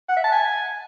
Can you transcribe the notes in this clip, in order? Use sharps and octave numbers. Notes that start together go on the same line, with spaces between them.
F#5
E5
A5
G#5